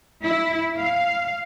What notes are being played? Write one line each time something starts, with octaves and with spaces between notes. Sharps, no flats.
E4
F5